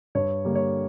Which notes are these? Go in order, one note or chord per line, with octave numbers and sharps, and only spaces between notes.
G2 C#5
D3 G3 A#3
C#5